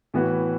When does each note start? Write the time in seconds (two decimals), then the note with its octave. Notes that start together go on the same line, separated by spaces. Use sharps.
0.14 A2 E3 B3 F#4